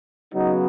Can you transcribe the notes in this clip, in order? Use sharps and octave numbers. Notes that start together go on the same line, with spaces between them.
C#3 F#3 B3 D#4